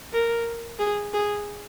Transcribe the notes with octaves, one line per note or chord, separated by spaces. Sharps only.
A#4
G#4
G#4